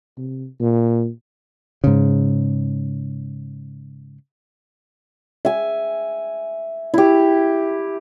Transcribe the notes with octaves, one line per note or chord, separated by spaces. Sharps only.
C3
A#2
G#2 C#3
E5 G#5
E4 G4